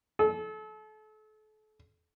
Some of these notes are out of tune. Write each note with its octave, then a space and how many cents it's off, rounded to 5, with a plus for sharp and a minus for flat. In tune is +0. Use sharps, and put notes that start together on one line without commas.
A4 -35